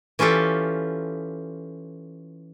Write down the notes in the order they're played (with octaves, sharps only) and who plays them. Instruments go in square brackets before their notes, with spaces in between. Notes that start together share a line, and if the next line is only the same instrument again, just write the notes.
[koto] E3 C#4 F4 G4 A4